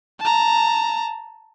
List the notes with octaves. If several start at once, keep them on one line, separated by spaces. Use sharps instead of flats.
A5 A#5